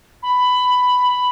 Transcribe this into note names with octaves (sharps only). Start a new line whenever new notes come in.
B5